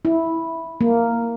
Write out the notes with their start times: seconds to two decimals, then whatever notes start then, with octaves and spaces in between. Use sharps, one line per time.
0.05 E4
0.81 A#3